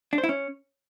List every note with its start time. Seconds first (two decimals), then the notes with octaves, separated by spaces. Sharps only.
0.13 D4
0.18 C5
0.24 E4
0.29 C#4